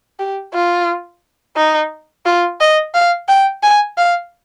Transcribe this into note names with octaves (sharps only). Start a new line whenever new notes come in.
G4
F4
D#4
F4
D#5
F5
G5
G#5
F5